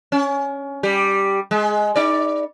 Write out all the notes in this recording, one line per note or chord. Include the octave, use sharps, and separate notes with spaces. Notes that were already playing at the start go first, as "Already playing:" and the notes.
C#4
G3 G4
G#3
D#4 D5